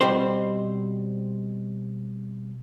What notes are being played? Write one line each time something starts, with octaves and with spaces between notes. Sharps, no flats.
B2 G3 C4 C5